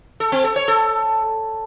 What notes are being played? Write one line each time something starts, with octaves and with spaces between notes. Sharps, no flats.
A4
C4
A4
C#5
A4